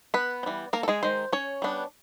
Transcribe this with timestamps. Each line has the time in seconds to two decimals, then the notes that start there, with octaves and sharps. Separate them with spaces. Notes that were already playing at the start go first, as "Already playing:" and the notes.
0.14 B3 B4
0.43 C4
0.46 E3 G3
0.73 A#3 A#4
0.83 A4
0.88 G#3 G#4
1.03 D#3 G#3 C5
1.33 C#4 C#5
1.62 G3 B3 D4